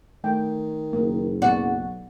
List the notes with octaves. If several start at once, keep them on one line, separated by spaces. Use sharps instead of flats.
D#3 A3 G5
F#1 A#3
B1 B3 F#4 D5